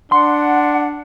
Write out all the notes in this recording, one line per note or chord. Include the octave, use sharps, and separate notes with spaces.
D4 F#5 C6